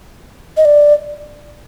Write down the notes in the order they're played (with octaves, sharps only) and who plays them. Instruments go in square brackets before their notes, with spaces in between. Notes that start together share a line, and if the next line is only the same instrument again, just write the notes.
[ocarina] D#5
D5